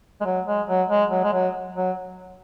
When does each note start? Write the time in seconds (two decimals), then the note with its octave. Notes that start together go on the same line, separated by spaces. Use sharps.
0.21 G#3
0.25 F#3
0.46 G#3
0.68 F#3
0.89 G#3
1.11 F#3
1.24 G#3
1.33 F#3
1.76 F#3